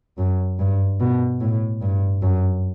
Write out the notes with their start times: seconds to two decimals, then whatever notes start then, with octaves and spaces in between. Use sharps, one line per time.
0.18 F#2
0.59 G2
1.00 B2
1.41 A2
1.82 G2
2.22 F#2